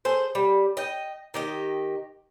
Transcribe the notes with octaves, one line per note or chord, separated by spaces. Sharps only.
G#4 A4 C5
G3
D#5 G5
D#3 G4 D#5